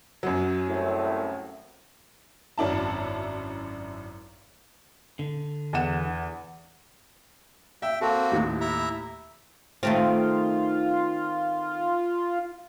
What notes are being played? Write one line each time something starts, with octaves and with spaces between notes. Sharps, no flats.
F#2 F#3
C2 A2
G#1 F#2 D4 E4 A5
D3
E2 F#5 E7
E5 G5
A#3 C4 F#4 A4
D#2 A2
E4 E5 A#5
D#3 A3 C4 F4